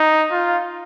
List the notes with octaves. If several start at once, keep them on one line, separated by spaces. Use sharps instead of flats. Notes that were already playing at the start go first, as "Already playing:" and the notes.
Already playing: D#4
F4